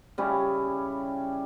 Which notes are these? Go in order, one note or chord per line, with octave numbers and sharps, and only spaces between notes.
C#3 G3 C#4 E4